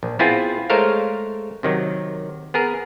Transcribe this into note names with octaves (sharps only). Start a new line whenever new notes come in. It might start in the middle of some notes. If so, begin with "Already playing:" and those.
A#1
B3 C4 E4 F4 G#4
G#3 A3 A#4 C5 C#5 F5
C3 D#3 F#3
B3 G#4 A#4